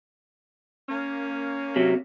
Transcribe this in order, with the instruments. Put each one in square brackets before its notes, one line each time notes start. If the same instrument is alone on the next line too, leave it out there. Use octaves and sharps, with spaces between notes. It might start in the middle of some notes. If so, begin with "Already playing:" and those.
[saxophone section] A#3 C#4
[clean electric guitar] C3 F#3